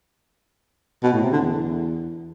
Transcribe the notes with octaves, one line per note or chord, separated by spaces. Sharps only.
B2
A2
C3
D3
E2